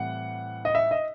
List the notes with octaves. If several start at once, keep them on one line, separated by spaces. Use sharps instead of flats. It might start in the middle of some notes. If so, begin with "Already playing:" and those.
Already playing: A2 E3 G3 C4 F#5
D#5
E5
D#5